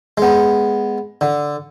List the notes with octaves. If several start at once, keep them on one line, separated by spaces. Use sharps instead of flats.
G#3 B3
D3